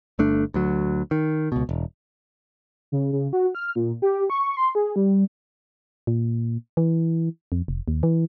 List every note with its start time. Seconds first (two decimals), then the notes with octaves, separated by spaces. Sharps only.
0.19 G1 A3 D4
0.54 D2 F#3
1.11 D#3
1.52 C#2 B2
1.69 E1
2.92 C#3
3.12 C#3
3.33 F#4
3.55 F6
3.75 A#2
4.02 G4
4.30 C#6
4.57 C6
4.75 G#4
4.96 G3
6.07 A#2
6.77 E3
7.52 F2
7.68 F1
7.88 D#2
8.03 E3